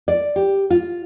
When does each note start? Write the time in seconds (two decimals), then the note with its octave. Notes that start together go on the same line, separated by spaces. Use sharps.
0.08 D5
0.36 G4
0.70 F4